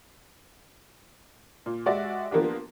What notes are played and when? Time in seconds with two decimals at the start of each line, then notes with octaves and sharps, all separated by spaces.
1.66 A#2
1.86 G#3 F#4 G4 D5 E5
2.31 F3 A#3 B3 D4 G4